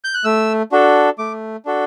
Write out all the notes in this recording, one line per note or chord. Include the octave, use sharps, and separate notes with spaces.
G6
F#6
A3 E6
D4 F#4 A4
A3 D6
D4 F#4 A4